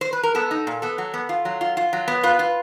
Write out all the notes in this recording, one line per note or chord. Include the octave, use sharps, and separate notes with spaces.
C5
B4
A#4
B3 A4
D#4
A#2
B3 A4
F#3
B3
F4
F#3
F4
F4
F#3
B3
F4 B4
F4